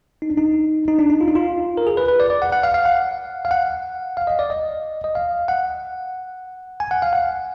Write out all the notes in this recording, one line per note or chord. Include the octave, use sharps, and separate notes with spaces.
D#4
D4
D#4
D#4
D4
D#4
F4
D#4
F4
A#4
G#4
B4
B4
D5
D5
F#5
F#5
F5
F5
F#5
F5
F#5
F5
D#5
D5
D#5
D#5
F5
F#5
G#5
F#5
F5
F#5